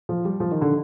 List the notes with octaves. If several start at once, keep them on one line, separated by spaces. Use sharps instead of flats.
F3
G3
F3
D#3
D3